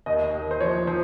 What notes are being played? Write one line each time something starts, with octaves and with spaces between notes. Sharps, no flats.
D#2 D#5
D#2
C5
F3 C#5
F3 C5